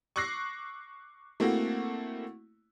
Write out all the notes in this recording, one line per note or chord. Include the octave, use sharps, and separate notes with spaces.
C#6 D6 E6 F#6 A#6 C7
A3 A#3 C4 E4 F#4